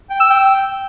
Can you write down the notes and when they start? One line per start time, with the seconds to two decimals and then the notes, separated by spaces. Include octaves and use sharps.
0.10 G5
0.20 E6
0.30 G5